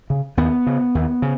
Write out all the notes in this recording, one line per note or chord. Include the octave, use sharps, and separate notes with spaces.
C#3
D#2 B3
C#3
D#2
C#3